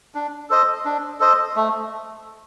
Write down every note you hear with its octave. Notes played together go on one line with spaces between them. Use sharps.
D4
A4 C5 D#5
D4
A4 C5 D#5
A3